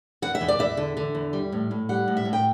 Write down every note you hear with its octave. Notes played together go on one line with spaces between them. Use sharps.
E2 F#5
E5
E2
D5
E2 E5
D3
D3
E2
G3
A2
A2
G3 F#5
A2
E5
A2
G5